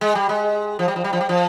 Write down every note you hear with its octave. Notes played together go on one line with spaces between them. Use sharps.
G#3
G3
G#3
F3
G3
F3
G3
F3
G3
F3